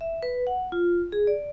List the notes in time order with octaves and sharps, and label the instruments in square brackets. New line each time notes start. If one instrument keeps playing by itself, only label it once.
[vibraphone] E5
B4
F#5
F4
G#4
D5